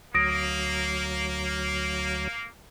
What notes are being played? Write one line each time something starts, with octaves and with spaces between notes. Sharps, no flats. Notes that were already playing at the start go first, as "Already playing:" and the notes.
D2 F#3 A#3 D#6 A#6 D7